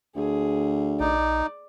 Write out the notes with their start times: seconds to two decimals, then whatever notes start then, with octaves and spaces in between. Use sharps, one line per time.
0.16 D2 G#4
1.00 A#1 D#4 D5